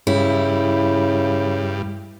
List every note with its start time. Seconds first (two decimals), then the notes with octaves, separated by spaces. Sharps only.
0.07 G2 C#3 E4